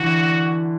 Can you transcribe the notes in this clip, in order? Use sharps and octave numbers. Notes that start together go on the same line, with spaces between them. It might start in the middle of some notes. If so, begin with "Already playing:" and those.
Already playing: D3 E3 F#4